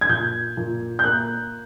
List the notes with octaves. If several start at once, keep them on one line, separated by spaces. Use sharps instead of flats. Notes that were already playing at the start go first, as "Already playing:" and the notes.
G#6
A#2 G6
A#2
G6
A#3 F#6